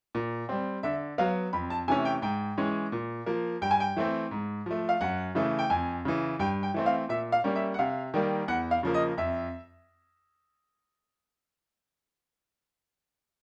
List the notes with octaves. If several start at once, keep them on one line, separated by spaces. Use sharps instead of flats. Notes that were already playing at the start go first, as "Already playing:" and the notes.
A#2
G3 C4
D3 E5
F#3 B3 F5
F2 B5
A5
C3 E3 A3 C#4 G#5
G5
G#2 G5
E3 G#3 C#4
A#2
F3 A#3
G2 G5
G#5
G5
E3 A3 C4
G#2
F3 A3
F5
F#2 F#5
C#3 E3 A3
G5
F2 G#5
C#3 E3
G2 G5
G5
E3 A3 C4
F5
A#2 E5
F5
G3 A#3 C#4
E5
F#5
C3 F5
D#3 G3 A#3
E2 F#5
F5
C#3 F3 A#3
D#5
F2 E5